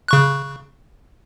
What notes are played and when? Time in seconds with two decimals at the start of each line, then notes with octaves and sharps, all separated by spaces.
0.08 C#3 C#6 F#6